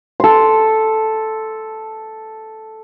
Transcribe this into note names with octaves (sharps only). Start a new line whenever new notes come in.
A4 C6